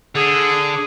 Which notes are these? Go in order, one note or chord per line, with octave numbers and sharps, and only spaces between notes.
D3 G#4